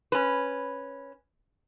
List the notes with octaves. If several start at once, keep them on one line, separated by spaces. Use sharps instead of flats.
C#4 B4